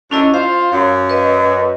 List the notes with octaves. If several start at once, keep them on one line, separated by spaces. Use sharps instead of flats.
F#2 A3 C#4 D4 E4 D#5
F4 C5 F5
F#2
B4 D#5